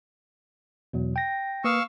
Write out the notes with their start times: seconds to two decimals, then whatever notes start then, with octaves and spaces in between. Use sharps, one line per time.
0.93 E2 B2 F#3
1.16 G5 A#6
1.64 A#3 B4 F5 C#6 D#6 E6